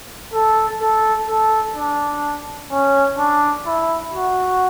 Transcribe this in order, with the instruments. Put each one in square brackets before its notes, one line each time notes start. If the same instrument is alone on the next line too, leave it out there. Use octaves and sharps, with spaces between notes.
[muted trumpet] A4
A4
A4
D4
C#4
D4
E4
F#4